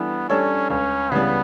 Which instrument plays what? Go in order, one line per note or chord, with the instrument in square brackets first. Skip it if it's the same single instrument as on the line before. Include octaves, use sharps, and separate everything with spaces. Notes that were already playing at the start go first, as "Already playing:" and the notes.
Already playing: [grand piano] E3 G3 D4 A4 [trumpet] B3
[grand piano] G3 D4 A4 C#5 [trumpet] C#4
[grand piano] C#2 [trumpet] C#4
[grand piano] C#3 E3 G3 [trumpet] B3